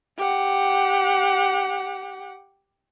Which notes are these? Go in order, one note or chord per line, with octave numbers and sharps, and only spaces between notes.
G4 F#5